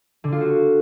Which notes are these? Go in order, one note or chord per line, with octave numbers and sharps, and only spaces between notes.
D3
F4
F#4